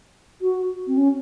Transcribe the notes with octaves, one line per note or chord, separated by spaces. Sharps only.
F#4
C4
C#4